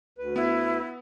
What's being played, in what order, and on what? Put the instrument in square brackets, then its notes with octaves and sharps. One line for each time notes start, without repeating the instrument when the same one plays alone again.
[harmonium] D2 B4
[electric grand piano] B3 [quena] E4